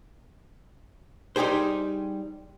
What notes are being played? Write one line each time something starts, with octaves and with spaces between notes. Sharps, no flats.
G3 D#4 G4 G#4 C5